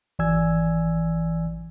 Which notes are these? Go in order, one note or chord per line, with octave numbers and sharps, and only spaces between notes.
G#1 E3 D5 G#5 E6 G#6